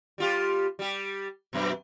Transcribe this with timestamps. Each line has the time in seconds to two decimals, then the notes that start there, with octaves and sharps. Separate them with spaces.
0.18 G3 F4 G4
0.79 G3 G4
1.53 F#2 B2